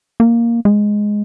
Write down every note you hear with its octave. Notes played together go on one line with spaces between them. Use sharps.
A#3
G#3